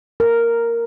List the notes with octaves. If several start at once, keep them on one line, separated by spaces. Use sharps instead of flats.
A#4